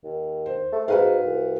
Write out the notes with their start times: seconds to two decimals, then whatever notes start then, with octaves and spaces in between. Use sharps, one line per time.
0.04 D#2
0.46 C5
0.72 A3
0.88 G#2 F#4 B4 F5
1.25 C2